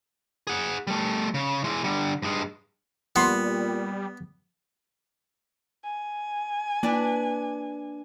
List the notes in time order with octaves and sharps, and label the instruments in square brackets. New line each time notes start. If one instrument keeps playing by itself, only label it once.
[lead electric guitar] G#4 F#5
G3 A3
C#3
E3 G#3
D3 G3
G2 G#3
[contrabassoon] A#2 [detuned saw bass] G3 [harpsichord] B3 [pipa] F#5 B5 C6
[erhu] G#5
[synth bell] A#3 [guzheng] D4 B4 D5